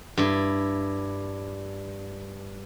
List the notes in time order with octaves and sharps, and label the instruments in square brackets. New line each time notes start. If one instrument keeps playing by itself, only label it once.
[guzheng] G2 E4